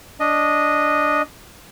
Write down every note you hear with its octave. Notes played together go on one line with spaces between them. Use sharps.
D4 D#5